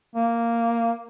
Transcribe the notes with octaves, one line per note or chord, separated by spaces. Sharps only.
A#3